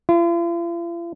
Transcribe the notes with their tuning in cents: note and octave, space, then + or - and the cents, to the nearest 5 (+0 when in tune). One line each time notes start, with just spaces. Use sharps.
F4 -45